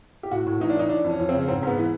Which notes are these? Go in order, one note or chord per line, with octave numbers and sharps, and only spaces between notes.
G4
A2 F#4
A2
E3 D#4
D4
E3 D#4
E3 D4
F2
C#4
F2
C#3 C4
C#4
G#2 C4
G#2 B3
E3